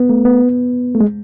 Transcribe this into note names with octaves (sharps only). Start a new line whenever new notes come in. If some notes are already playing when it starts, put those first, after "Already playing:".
Already playing: B3
A3
B3
A3
G#3